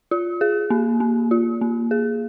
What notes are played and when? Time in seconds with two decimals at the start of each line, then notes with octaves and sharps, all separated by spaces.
0.11 F4
0.41 G#4
0.70 A#3
1.00 A#3
1.31 F4
1.61 A#3
1.91 G#4